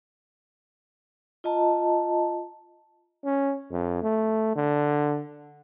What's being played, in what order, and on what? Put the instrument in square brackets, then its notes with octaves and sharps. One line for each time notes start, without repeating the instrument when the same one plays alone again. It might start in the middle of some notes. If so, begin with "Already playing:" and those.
[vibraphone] F4 D#5 A5 A#5
[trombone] C#4
F2
A3
D3